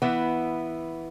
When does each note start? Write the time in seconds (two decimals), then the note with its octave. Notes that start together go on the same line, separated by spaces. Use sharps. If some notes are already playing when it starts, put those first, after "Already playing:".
0.02 E3 B3 E4